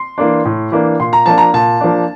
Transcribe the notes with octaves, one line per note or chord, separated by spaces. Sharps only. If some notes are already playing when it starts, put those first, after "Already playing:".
Already playing: C6
E3 A#3 D4
A2
E3 A#3 D4
A#2 C6
A#5
F3 A#3 D4 A5
A#5
A#2 A5
F3 A#3 D4